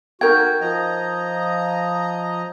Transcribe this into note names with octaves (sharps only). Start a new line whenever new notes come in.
D#4 F#4 A#4 G5 G6 G#6
F3 D#5 A#5